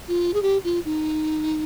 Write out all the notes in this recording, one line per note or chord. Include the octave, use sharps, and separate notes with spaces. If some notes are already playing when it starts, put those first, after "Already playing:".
F4
G#4
G4
F4
D#4